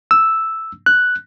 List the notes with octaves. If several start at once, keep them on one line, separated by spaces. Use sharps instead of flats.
E6
F#6